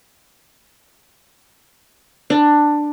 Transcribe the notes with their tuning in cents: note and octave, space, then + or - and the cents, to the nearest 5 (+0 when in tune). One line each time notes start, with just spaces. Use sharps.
D4 +10